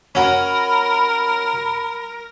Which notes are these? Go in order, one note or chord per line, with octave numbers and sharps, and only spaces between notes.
C#4 F#4 A#4 B5